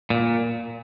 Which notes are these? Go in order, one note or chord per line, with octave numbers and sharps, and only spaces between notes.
A#2